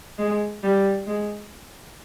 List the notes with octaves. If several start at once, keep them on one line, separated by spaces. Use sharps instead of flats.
G#3
G3
G#3